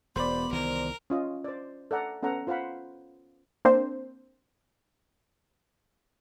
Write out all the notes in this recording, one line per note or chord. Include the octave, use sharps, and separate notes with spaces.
E1 B3 C5 D5 B5
C2 D#3 E3 A#4
C#4 F4 D#5
C5 D5
A4 D5 F#5 A#5
B3 C#4 A4 F#5 A#5
F4 C5 F5 F#5 B5
A#3 C4 D4 C5